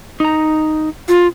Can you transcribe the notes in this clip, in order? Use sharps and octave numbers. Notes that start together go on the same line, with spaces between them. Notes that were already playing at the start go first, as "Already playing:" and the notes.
D#4 A#5
F4